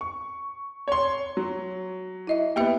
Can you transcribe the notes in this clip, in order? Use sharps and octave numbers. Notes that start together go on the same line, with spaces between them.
C#6
C#5 C6
F#3
E4 D#5 E5
A#3 B3 G4 E5 G5